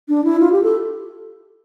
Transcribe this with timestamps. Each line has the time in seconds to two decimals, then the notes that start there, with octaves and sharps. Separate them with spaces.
0.09 D4
0.24 E4
0.40 F4
0.52 G4
0.63 A4